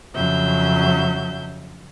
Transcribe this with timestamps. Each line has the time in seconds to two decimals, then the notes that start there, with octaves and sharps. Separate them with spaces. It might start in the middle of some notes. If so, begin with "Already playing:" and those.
0.14 F2 C#3 F#3 E5 G6